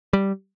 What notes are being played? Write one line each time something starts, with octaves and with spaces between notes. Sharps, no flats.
G3